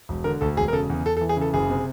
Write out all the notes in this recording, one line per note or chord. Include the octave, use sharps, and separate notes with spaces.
E1
D3 A#4
D2 A4
E1 G#4
A#4
C#3 A4
E2
E2 A4
A4
E3
G#4
C#3 A4
F#1 G#4
C3